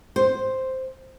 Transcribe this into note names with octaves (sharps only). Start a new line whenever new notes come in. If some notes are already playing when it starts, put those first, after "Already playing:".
C5